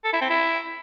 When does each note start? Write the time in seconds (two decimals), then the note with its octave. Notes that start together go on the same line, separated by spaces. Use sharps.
0.04 A4
0.13 E4
0.21 C4
0.30 E4